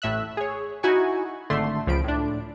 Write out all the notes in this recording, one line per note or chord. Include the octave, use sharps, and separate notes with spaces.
A1 A2 E5 E6 F#6
G#4 C#5
D#4 E4 F#4 G#5 C#6
G#1 D3 A3 C6
C#2 F3 B5 D7
A2 D4